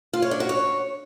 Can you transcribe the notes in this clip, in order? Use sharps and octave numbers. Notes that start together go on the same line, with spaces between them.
F4
C#5
D4
F#4
C#5